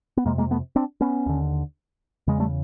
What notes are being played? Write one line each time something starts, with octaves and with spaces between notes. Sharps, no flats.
B3
F2 C3 G#3 A#3
G#3 A#3
A3 B3
C4 D4
B3 C#4
D#2 D3
E2 C#3 G#3
G3 A3